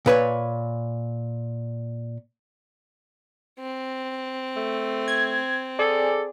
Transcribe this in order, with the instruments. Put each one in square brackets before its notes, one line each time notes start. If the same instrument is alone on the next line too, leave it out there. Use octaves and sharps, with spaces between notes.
[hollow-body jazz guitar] A#2 B4 C#5
[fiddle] C4
[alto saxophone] A3
[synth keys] G#6
[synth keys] G#4 D5 [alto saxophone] A4